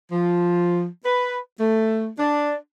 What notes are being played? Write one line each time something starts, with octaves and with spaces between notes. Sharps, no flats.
F3
B4
A3
D4